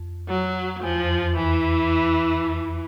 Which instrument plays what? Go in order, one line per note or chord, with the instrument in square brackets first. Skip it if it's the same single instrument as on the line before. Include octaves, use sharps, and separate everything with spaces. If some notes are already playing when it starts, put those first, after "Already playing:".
Already playing: [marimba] F2
[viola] F#3
[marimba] E2 [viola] F3
[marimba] F2
F2
[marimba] E2 [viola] E3
[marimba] F2